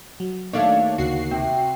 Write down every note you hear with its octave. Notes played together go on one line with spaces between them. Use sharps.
F#3
D#2 A3 D4 C#5 D5 F5
D2 C#3 F#4 C7
C3 C4